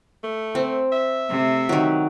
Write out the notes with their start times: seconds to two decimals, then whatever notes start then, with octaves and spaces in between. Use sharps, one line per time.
0.23 A3
0.55 C4
0.92 E5
1.29 C3 A3
1.69 D#3 F#3